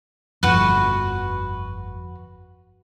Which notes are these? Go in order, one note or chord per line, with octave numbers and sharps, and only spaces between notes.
G1 F2 F#4 B4